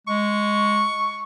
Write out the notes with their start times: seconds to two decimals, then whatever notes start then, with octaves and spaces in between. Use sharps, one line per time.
0.07 G#3 C#6